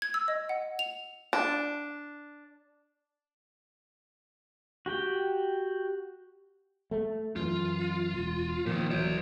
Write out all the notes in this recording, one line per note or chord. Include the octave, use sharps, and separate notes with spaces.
G#6
E6
D#5
F#5
F7
D4
F#4 G4 G5
A3
F#2 E3 F4
E1
A#2 D#3 F3 A#3
D#1 E3 F#3 C5 D5